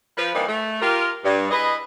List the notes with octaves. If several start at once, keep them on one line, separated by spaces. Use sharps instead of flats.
F3 B4
E3 G3 A#3 C4 D4 D#4
A3
F4 G4 A#4
G2
E4 G#4 B4 D#5